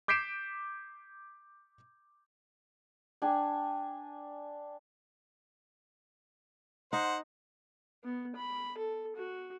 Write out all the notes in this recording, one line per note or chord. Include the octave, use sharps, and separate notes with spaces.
D6 G6 B6 C7 D7 E7
D4 G5 G#5
D#4 C5 F#5
B3
B5
A4
F#4